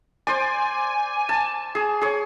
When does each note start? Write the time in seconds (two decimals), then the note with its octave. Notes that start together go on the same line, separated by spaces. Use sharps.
0.27 C5 D5 G#5
1.29 A5
1.75 G#4
2.02 G#4 C#5